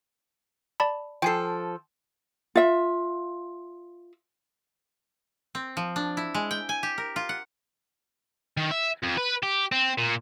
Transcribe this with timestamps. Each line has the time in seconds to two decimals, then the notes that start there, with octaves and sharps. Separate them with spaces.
0.80 D5 A5 B5
1.22 F3 A4 G5 G#5 C7
2.55 F4 E5
5.55 C4
5.77 F3
5.96 D4
6.17 E4
6.34 G#3
6.51 G5
6.69 G#5
6.83 G4
6.98 A#4
7.16 F4
7.29 F#5
8.57 D#3
8.71 E5
9.03 F2
9.18 B4
9.43 G4
9.72 C4
9.98 A#2